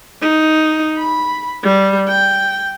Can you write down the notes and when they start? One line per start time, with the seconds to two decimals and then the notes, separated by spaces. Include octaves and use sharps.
0.22 D#4
0.98 B5
1.63 G3
2.08 G5